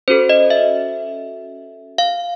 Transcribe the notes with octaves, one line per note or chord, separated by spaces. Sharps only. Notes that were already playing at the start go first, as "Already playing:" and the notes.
C#4 F#4 A4 C5
D#5
E5
F5